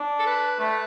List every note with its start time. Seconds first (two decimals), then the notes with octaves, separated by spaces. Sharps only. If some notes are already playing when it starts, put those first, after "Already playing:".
Already playing: D4
0.19 A4
0.27 B4
0.59 A3 B4